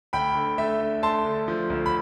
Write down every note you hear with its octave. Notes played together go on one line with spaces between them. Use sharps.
D2 G5 B5
D3
A3 E5
D3
A3 A5 C6
D3
F3
D2
B5